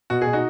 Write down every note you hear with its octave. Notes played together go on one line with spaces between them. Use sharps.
B2 F#4
G#4
B2
D#4 F#4